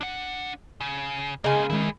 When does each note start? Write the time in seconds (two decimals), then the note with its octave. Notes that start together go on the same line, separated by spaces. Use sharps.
0.01 D4 F#5
0.80 C#3
1.44 C#3 G#3 A#3 D#5 G#5
1.70 D#3 G#3 E4 G#4